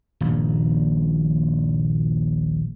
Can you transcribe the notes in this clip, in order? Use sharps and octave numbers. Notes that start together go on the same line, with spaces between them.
D#1 A#1